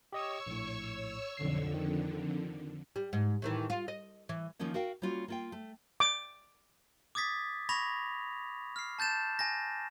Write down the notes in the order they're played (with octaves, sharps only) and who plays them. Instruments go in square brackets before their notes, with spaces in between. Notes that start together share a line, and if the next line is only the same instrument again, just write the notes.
[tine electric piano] G4 D#5 D#6 [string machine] C#5 C#6 E6
[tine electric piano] A#1 A2
[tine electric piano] B1 C7 [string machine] F2 D3
[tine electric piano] D#3
[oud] G3
G#2
A2 D#3 E3
F4
D#5
E3
[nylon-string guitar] D#3 F3 A#3 C#4 D#4
F#4 A#4 F5 G5
G3 A#3 C#4 F4 F#4
A#3 F4 G5
A3
[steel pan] D6
[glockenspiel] D6 D#6 G#6 A6 B6
B5 C#6 G#6 A#6 F7
F6 C7
A5 G6 A6 E7
G#5 A#6